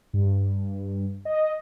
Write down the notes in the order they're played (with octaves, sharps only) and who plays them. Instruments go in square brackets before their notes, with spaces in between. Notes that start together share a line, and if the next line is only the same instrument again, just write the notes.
[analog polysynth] G2
D#5